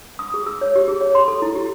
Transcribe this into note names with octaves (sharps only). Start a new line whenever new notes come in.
D#6
G#4
E6
C#5
G4
G#4
C#5
C6
A4
E4
G4